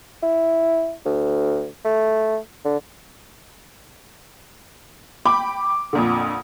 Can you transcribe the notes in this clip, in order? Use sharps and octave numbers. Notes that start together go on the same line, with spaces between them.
E4
D2
A3
D3
G5 B5 D6
F2 A#2 D3